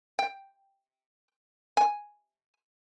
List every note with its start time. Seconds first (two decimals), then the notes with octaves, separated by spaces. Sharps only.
0.19 G5
1.77 G#5